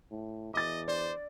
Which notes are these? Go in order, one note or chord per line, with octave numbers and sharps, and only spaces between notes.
A2
E2 D#5 D6 A6
C5 D5